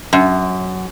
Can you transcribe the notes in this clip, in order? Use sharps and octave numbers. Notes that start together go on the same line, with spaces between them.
F#2